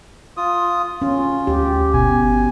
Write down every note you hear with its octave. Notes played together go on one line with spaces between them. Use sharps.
F4 D#6
C#4 F4
D2 G4
G1 B2 G#5